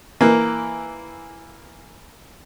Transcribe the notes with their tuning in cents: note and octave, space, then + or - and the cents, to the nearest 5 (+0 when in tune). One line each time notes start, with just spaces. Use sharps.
E3 +0 A#3 +0